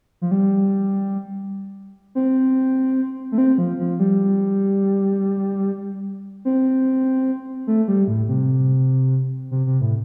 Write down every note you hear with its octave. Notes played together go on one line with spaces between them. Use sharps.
F3
G3
C4
A3
C4
F3
F3
G3
C4
A3
G3
A2
C3
C3
C3
A2